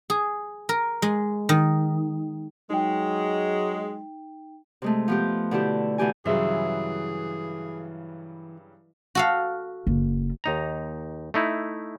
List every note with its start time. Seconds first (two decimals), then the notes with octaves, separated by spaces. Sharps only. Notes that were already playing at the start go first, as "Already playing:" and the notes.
0.10 G#4
0.69 A#4
1.02 G#3
1.49 D#3
2.70 F#3 G#3 D#4 G5
4.82 C3 G#3 A3
5.08 F3 B3 G4
5.51 B2 D3 E4 G4
5.98 B2 E3 A3 G4 G#5
6.26 G2 C#3 E3 F#3 G#4 E5 C6
9.15 F#4 A4 F5
9.87 F#1
10.44 D#2 D#4 A#5
11.34 A3 D#4 E4